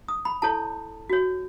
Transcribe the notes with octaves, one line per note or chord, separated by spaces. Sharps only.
D#6
B5
E4 A4 C#5 A5
F#4 C#5